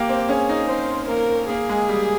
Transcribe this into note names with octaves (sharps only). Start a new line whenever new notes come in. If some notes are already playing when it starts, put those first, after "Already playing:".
Already playing: A#3 G4
C4
C#4 G#4
D#4
C4 C5
A#3 A#4
A#3 G#4
G#3
G3